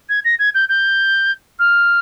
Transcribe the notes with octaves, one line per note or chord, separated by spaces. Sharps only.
G#6
A#6
G#6
G6
G6
F6